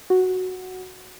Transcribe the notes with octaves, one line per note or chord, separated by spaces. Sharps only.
F#4